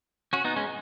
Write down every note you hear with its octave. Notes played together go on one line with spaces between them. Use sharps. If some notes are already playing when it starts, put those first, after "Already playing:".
C#4 F#4
B3 D#4
G#3 C#4